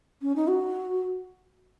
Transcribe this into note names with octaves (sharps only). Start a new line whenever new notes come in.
C#4
D#4
F#4